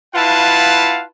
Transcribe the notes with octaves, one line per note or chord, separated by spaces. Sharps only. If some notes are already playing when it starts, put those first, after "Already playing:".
E4 F4 B4 F5 F#5 A5